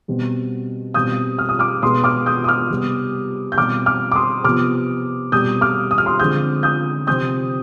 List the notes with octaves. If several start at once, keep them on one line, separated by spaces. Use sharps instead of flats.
B2 G3 C4
B2 G3 C4 D#6 G6
F6
D#6
D6 F6
B2 G#3 B3 C6 D#6
D6 F6
D#6 G6
D#6
D6 F6
C3 G3 B3
G6
B2 G3 C4 D6 F6
D6 F6
D6
C6 D#6
C3 F3 B3 D6 F6
B2 G3 C4 D#6 G6
D6 F6
D#6
F6
C6 D#6
D3 F3 G#3 C4 D#6 G6
D#6 G6
C3 F3 C4 D#6 G6